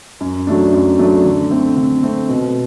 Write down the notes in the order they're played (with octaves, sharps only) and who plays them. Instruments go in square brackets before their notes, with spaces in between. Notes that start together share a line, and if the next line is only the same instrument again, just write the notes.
[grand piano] F#2
F#3 A3 D4
F#2
F#3 A3 D4
D3
A3 C4
D3
A3 C4
B2